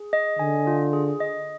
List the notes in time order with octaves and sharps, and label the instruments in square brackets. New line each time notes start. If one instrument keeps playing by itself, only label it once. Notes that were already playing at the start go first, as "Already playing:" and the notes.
Already playing: [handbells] G#4
D#5
[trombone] D3 [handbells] G#5
[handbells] F4
G#4
D#5